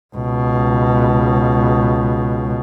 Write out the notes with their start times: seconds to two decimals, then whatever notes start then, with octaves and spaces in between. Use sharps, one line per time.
0.16 C#2 B2